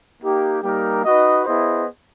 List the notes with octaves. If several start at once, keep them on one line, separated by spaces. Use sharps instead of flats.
A#3 D#4 G4
G3 A#3 D#4 G4 A#4
D#4 F#4 B4 D#5
B3 E4 G#4 C5 D#5